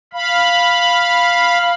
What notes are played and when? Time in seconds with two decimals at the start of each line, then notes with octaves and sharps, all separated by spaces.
0.13 F5 B5